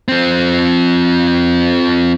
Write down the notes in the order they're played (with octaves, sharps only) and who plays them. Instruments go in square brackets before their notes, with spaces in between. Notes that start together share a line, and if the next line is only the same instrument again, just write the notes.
[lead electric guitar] F3 C4